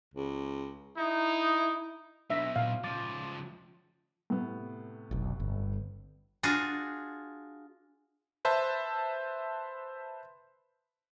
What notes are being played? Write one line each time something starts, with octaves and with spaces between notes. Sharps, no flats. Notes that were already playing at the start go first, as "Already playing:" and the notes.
C#2
D#4 E4
B2 F#3 D4 E5 A#6 B6
A#2 F5
C#2 F3 D6 A6
A2 C3 B3
F1 B1
G1
D4 F4 F#4 G#4
B4 C5 E5 A5